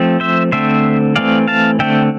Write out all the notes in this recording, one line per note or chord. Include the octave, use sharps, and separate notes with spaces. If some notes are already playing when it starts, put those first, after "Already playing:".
Already playing: F3 A3 C4
C5 E5
D3 A3 C4 C5 E5
E3 A3 C4 D5 F5
F5 A5
D3 A3 C4 E5 G5